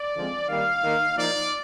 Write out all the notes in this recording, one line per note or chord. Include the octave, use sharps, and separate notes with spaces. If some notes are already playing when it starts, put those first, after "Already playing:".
Already playing: D5
D3 F3 G#3 C4
D#3 G3 A#3 F5
D#3 A#3 D#4
F3 A#3 D#4 D5